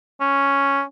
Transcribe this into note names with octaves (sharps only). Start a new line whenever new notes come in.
C#4